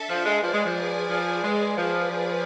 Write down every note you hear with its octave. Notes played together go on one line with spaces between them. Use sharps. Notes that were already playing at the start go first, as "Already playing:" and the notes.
Already playing: D4 A4 E5 A5
F3
G#3
F3 G#4 B4 D5 G#5
G#3
F3
F3
G#3
F3 G#4 B4 D5
F3